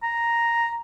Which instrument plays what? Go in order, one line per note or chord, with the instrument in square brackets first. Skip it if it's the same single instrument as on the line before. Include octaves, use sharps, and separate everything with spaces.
[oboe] A#5